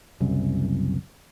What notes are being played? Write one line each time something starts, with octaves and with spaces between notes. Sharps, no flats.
F#1 C2 F#2